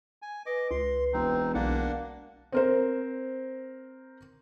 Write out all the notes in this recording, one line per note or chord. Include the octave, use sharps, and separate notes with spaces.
G#5
B4 D#5 D6
C#2 C6
E1 C4 D#4
B1 A#3 D4 F#5
C4 A#4 C5